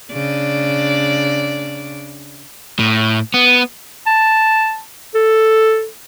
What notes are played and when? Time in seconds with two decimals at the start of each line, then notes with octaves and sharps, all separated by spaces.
0.12 C#3 D4 D5
2.79 A2
3.34 B3
4.07 A5
5.15 A4